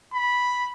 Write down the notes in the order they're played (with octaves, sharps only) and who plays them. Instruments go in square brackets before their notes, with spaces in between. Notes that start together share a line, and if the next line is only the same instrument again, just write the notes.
[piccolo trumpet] B5